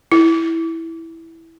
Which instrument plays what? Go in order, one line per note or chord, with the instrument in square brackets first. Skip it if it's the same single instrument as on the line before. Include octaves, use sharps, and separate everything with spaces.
[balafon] E4